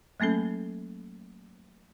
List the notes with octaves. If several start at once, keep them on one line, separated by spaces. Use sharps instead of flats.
F#3 A3 A#3 C#4 A4